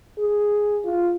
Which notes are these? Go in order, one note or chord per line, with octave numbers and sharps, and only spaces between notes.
G#4
F4